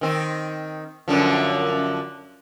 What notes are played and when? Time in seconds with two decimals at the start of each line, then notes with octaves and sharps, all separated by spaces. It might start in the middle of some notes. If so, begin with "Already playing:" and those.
0.01 D#3 C4
1.08 F#2 D3 F3